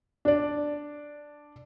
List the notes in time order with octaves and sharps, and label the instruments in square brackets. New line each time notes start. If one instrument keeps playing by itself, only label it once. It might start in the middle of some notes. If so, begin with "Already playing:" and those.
[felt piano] D4 D5